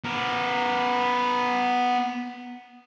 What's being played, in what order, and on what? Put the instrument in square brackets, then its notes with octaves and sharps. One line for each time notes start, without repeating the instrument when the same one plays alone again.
[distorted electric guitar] B3 A#4